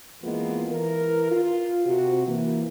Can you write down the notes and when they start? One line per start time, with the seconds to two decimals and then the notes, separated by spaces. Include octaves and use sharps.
0.22 F2 E3 G#3 A#3 B3 F4
0.71 E3 A#4
1.30 F4
1.84 C3 F#4
2.26 E3 A#3